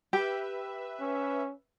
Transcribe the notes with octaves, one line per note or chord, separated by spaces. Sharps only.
G4 B4 E5
C#4